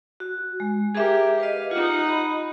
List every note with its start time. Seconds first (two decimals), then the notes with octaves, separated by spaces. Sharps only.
0.20 F#4
0.60 G#3
0.95 G4 G#4 A#4 E5
1.40 B4 D#5 F5
1.71 D#4 F4 F#5
2.07 D#5 B5